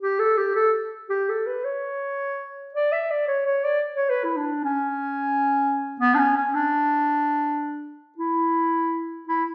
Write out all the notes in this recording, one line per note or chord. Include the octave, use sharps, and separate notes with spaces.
G4
A4
G4
A4
G4
A4
B4
C#5
D5
E5
D5
C#5
C#5
D5
C#5
B4
E4
D4
C#4
B3
D4
C#4
C#4
D4
E4
E4